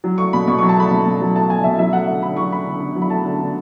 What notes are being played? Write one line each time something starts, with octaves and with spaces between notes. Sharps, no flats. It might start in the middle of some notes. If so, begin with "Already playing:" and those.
F#3
A3 C#6
B2 B5
B2 C#6
F#3 C#6
A5
A3 B5
B2
B2
F#3
A3 A5
B2 G#5
B2 E5
F#3 E5
A3 F#5
D3 E5
D3 B5
F#3 C#6
A3 B5
D3
D3
F#3
B5
A3 A5
D3
D3